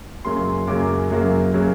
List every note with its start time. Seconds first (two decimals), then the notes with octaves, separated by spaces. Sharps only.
0.25 F#2 C#3 F#3 A#3 C6
0.67 F#2 C#3 F#3 A#3 D6
1.10 F#2 C#3 F#3 A#3
1.53 C#3 F#3 A#3